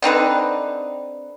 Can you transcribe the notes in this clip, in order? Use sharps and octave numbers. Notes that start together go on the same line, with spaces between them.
D3 C4 D#4 B4